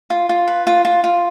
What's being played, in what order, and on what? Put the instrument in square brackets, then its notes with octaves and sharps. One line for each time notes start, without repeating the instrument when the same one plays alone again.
[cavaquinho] F4
F4
B4
F4
F4
F4